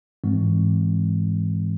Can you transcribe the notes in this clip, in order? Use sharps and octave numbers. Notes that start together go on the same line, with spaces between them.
G#2 E3 G#3 C4